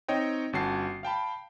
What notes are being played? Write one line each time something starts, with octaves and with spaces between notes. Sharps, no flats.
C4 D#4 C#5 D#5 G5
G1 C#4 F#4 A5 C7
F5 G5 A5 B5